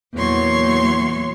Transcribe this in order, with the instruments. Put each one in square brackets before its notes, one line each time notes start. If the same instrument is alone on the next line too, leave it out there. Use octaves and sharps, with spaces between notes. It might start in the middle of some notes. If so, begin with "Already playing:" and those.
[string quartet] E2 A#2 F#3 C#5 C6 C#6